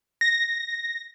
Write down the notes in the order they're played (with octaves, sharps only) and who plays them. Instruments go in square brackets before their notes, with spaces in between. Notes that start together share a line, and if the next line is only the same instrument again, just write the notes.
[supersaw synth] A#6